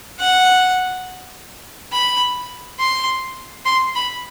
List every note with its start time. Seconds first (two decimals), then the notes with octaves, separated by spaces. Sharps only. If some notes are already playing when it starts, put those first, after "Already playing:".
0.19 F#5
1.93 B5
2.79 C6
3.65 C6
3.95 B5